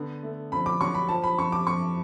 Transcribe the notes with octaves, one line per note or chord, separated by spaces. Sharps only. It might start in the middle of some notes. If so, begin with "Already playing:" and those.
Already playing: D3 B3
A3
F2 B5
D6
F#3 C#6
B5
F3 A5
B5
F2 C#6
D6
F2 C#6